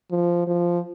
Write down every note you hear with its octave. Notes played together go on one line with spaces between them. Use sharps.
F3
F3